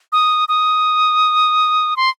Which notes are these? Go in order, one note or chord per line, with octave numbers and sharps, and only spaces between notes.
D#6
D#6
C6